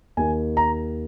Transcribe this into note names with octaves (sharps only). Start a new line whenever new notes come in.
D#2 D#3 G#5
A#5